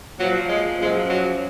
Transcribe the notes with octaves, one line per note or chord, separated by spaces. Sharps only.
A#2 F3 F#3
G#3
F#2 F3 G#3
F#3